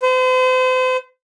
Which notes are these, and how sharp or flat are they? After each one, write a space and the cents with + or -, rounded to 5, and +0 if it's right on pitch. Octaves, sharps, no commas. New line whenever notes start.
C5 -40